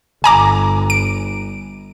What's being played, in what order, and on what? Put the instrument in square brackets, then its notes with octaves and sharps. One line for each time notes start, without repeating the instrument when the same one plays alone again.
[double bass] G1 [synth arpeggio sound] G#5 A#5 D6
[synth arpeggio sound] D7